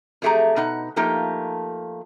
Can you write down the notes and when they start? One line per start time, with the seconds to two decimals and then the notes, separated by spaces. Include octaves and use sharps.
0.22 F2 F#3 A3 G4 G#4 A#5
0.56 B2 D#4 F#5
0.96 F3 A3 A#3 D#4 F4 G4